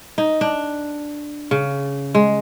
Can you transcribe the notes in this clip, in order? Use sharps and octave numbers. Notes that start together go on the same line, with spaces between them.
D#4
D4
C#3
G#3